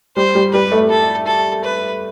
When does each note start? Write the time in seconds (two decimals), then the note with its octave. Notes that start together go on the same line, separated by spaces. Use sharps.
0.17 G3 C5
0.35 G3
0.53 G3 B4
0.72 A3
0.89 A4
1.27 A4
1.64 B4